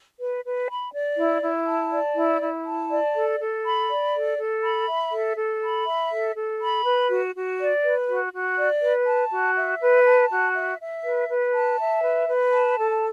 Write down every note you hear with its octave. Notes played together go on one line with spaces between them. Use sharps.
B4
B4
B5
D5
E4
E4
A5
D5
E4
E4
A5
D5
A4
A4
B5
D5
A4
A4
B5
E5
A4
A4
B5
E5
A4
A4
B5
B4
F#4
F#4
D5
B4
F#4
F#4
D5
B4
A5
F#4
E5
B4
A5
F#4
E5
E5
B4
B4
A5
E5
B4
B4
A5
A4